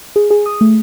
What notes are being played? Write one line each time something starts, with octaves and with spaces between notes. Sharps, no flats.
G#4
G#4
D#6
A3